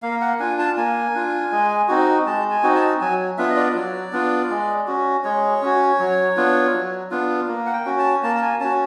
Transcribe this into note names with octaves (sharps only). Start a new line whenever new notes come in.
A#3 F5
F#5
D4 F4 G#5
A5
A#3 G#5
D4 F4
G#3
C4 D#4 F#4
G#3 A5
G#5
C4 D#4 F#4
A5
F#3 G#5
B3 D4 F4 E5
D#5
D5
F#3
B3 D4 F4
G#3
C#4 F#4
G#3 C#5
C#4 F#4
F#3
B3 D4 F4
F#3
B3 D4 F4
A#3
F#5
G5
C#4 F#4
A5
A#3 A5
A5
G#5
C#4 F#4 A5